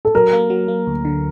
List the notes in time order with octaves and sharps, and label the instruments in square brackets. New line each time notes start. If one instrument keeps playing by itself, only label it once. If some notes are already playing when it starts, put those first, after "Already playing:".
[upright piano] A4
[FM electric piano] F#3 [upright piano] A#4
[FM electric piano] A#3
F#3
A#3
D2
D3